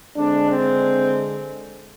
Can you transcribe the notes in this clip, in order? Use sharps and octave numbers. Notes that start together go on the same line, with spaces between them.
D3 G#3 C4 D4
C4